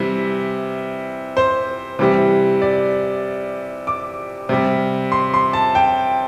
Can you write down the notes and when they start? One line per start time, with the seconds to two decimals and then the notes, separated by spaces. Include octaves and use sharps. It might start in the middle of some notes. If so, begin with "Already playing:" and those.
Already playing: C3 E3 G3
1.37 C5
1.99 C3 E3 G3
2.62 D5
3.87 D6
4.49 C3 G3
5.12 C6
5.34 C6
5.53 A5
5.75 G5